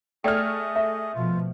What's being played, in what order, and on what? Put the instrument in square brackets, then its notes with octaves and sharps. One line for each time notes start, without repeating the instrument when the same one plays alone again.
[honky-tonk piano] A3 F6 [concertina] G#4 D#5 [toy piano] D5 G5
[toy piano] E5
[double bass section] B2 F3 [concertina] F4